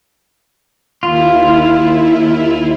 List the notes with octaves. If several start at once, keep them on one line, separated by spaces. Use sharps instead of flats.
D#2 E4 F4